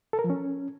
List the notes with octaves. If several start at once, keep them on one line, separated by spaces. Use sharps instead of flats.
A4
A#4
F3
C#4